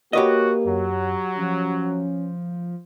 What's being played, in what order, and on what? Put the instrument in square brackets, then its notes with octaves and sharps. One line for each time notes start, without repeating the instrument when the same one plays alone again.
[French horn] A#3 [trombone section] F#4 [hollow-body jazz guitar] G4 B4 D#5 [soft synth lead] C#5
[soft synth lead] F#2 [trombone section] F#3
[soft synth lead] F3 [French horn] C#4